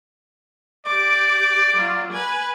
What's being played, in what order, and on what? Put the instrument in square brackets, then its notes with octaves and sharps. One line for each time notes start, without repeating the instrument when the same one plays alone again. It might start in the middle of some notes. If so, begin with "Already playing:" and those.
[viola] G4 D6 [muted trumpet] D5
[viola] F#3 F4
B4 G#5